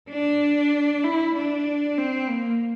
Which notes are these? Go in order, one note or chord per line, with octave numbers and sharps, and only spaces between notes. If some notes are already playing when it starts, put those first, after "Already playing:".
D4
E4
D4
C4
A#3